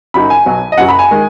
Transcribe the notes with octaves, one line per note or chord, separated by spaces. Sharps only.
F#1 F#2 F#3 D#4 B5
G#5
B1 B2 F#3
D#5
F#1 F#2 F#3 F#5
B5
G#5
D#3 G#3